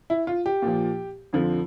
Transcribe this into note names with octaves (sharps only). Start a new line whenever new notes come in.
E4
F4
G4
A#2 F3
F2 D3 F3